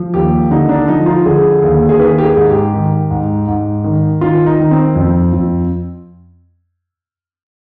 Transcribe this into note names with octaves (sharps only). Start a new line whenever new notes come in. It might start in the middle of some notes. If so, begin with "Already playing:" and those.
Already playing: F3
D#2 G4
D3 D#4
D4
F3 D#4
F4
D3 G#4
D#2
G#4
D#3 B4
G4
G#4
G#2
G4
D#3
G#2
G#2
D#3
D#3 F4
D#4
D#3
C4
F2
F2